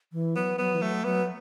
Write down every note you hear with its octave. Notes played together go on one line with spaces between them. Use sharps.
E3
F#3 B3
F#3 B3
E3
F#3 A3
F#3 B3